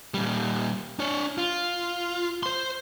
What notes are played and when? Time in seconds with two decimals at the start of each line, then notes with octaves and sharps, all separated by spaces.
0.14 A#2 G3
0.99 D4 C#5
1.38 F4
2.43 C5 C6